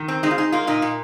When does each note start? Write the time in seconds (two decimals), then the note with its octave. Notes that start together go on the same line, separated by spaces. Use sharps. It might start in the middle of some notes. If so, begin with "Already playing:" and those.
Already playing: D#3
0.08 C4
0.23 G#3 D#4
0.31 F4
0.38 D#4 G#4
0.52 A#3 F4
0.67 A#2 D#4
0.82 A#2